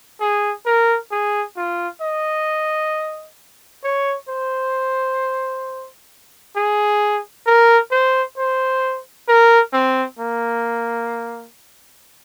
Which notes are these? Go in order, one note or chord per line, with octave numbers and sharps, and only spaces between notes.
G#4
A#4
G#4
F4
D#5
C#5
C5
G#4
A#4
C5
C5
A#4
C4
A#3